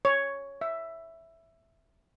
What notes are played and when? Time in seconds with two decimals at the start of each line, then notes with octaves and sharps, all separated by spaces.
0.05 C#5
0.61 E5